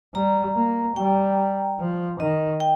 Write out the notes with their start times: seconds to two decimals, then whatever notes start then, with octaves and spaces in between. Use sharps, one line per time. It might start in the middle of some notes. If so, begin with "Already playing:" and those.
0.14 G3 A#5
0.56 A#3
0.96 G3 G5
1.79 F3
2.19 D#3 D#5
2.60 G5